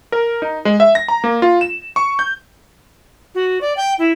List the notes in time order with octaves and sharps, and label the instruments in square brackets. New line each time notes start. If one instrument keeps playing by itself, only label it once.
[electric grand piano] A#4
D#4
G#3
E5
A#6
A#5
A#3
F4
E7
C#6
G6
[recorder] F#4
D5
G5
E4